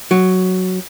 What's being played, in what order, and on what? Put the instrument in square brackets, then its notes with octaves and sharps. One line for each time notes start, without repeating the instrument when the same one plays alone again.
[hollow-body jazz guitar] F#3